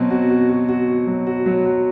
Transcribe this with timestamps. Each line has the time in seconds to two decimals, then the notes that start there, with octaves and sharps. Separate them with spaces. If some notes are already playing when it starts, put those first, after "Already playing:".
Already playing: B2 F#3 C4 F#4
0.10 F#4
0.30 F#4
0.49 F#4
0.68 F#4
0.88 F#4
1.07 F#3
1.27 F#4
1.46 F#3
1.65 F#4